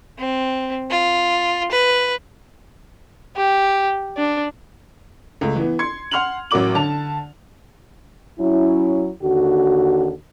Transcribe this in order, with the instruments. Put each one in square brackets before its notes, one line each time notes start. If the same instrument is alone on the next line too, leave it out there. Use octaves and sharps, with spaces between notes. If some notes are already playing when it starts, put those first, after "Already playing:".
[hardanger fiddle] C4
F4
B4
[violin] G4
D4
[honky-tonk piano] C#2 A3
E3 B3
C6 G#6 C#7
F#5 C6 F6 F7 F#7
A1 F#3 F#4 A#4 D6 F#7
D3 A5 F7
[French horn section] F#3 C#4 E4
D#2 D3 F#4